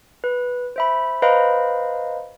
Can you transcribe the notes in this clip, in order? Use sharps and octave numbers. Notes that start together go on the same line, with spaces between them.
B4
C5 E5 B5
B4 C5 D#5 F5 A#5 B5